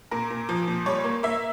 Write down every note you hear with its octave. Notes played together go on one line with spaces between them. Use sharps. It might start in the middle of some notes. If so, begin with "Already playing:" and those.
A#2 A#4
A#2
F3
A#2
G3 C#5
A#3
A#3 E5